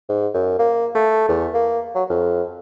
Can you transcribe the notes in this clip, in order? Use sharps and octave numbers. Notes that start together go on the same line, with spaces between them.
G#2
F#2
A#3
A3
E2
A#3
F#3
F2